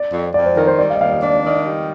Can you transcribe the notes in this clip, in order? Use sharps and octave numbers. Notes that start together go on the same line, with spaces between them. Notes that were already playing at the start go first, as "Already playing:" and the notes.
Already playing: D5
F2
F2 D5
C5
D#3 A#4
C5
G3 D5
F5
D#5
D#2 F5
D#5
D4 D5
D#3
G3